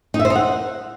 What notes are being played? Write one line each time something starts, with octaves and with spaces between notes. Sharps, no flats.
D#4
E5
C5
D#4
F#5